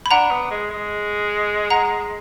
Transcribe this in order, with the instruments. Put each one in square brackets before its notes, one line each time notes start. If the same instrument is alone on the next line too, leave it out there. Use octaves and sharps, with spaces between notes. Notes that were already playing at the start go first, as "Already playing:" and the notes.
[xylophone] B5
[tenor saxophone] D4 [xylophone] F#5 A#5
[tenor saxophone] B3
G#3
G#3
[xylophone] F#5 A#5